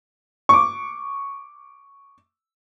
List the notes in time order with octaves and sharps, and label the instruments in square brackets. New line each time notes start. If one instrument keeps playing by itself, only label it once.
[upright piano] C#6 D6